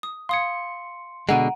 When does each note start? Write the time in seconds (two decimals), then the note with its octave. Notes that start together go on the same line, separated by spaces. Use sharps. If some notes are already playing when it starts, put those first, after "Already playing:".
0.03 D#6
0.29 F5 C6 D#6 G#6 C#7
1.29 B2 D3 G#3 F#5 A#5 D7 D#7